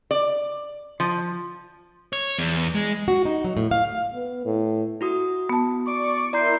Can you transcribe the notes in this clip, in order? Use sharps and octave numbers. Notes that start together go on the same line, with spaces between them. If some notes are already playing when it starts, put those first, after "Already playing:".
D5
F3
C#5
E2
G#3
F#4
D#4
F#3
A2
F5
B3
A2
E4 F#4 D#6
B3 A5
D5 C#6 D6
E4 A#4 D5 A#5 C6 G6